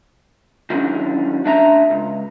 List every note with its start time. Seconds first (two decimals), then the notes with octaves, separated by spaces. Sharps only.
0.70 D#3 E3 F#3 G3 C#4 D4
1.44 D2 D4 E5 A#5
1.90 C#2